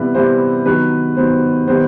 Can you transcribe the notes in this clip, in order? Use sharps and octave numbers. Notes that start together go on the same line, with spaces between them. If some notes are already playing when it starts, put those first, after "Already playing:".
Already playing: C3 E3 G3 B3 E4 B4
C3 E3 G3 B3 E4 C5
D#3 F#3 B3 B4
D#3 F#3 B3 C5
D#3 G3 B3 C5